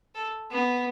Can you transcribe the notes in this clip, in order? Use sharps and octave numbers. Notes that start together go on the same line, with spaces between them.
A4
B3